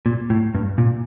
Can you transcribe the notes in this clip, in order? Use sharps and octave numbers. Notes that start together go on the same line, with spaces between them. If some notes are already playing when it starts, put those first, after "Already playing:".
A#2
A2
G2
A#2